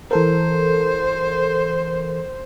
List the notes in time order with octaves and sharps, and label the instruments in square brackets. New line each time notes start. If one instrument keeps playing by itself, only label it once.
[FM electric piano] E3 A4 A#4 [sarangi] C5